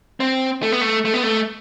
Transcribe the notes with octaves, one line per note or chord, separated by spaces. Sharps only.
C4
A3
B3
A3
A3
B3
A3